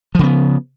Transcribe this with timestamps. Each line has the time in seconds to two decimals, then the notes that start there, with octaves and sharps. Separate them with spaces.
0.15 F3
0.19 C#3
0.23 B3